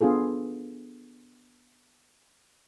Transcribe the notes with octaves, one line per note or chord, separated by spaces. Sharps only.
B3 D4 F4 G#4 A4